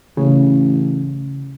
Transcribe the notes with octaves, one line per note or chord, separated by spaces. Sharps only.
A1 C#3